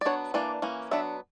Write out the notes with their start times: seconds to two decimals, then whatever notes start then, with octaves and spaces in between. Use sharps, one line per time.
0.01 D5
0.05 F#3 B3 D4 C#5
0.34 E3 A#3 D4 D5
0.62 E3 A#3 C#4
0.91 F#3 B3 D4 E5